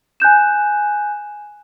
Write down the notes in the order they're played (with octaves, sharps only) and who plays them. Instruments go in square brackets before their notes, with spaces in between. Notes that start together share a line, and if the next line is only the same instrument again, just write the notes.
[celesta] G#5 F#6 G6 E7